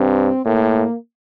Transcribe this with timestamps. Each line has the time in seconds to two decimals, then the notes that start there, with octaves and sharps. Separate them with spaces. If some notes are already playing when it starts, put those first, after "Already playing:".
Already playing: G2 C4
0.45 A2 A#3